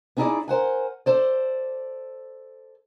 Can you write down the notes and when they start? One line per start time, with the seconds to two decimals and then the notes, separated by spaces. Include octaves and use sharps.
0.17 B3 C#4 D#4 E4 G#4 D5
0.48 A#4 C5 F#5 G#5
1.06 A4 C5 D5